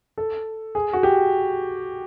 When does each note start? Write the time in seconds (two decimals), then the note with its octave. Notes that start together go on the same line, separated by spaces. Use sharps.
0.18 A4
0.75 G#4
0.93 F#4
1.03 G4